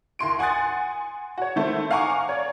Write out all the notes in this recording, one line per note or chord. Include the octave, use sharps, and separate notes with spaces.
D#2 E4 C6 D7
F#5 G#5 C6 D#6 F#6 A6
F#4 C#5
D#3 A3 C4 E4
F5 F#5 G#5 A#5 C#6 D6
C#5 D5